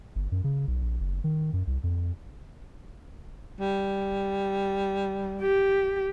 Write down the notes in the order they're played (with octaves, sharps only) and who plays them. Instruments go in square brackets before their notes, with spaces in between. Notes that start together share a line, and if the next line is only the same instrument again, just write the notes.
[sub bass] G1
F#2
C#3
B1
A#1
F#1
D#3
F#2
C2
F2
[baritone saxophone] G3
[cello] G4